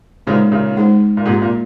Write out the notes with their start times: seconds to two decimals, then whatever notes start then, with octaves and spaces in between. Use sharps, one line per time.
0.27 A#2 C#3 G#3 D#4 G#4 C5
0.52 A#2 C#3
0.77 G#3 D#4 G#4 C5
1.17 A#2
1.25 G#2 C3 A#3 F4 G#4
1.42 A#2